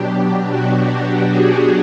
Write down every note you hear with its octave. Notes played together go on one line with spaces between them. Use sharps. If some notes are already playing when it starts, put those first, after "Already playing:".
Already playing: B2 F#3 D4 G4
F#4
G4
G#4